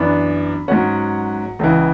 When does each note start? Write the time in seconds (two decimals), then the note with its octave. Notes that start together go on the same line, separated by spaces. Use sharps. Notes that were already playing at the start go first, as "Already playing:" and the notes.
Already playing: F#2 E3 B3 D4 B5
0.68 G#2 F#3 C#4 F#5
1.59 C#2 C#3 E3